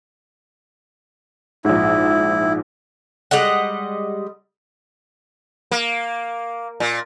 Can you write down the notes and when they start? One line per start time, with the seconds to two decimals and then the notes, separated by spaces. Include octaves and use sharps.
1.65 A#1 G#2 E4
3.31 G3 G#3 D#5 F#5
5.71 A#3
6.80 A#2